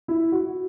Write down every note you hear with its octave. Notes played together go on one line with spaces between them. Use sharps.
E4
F#4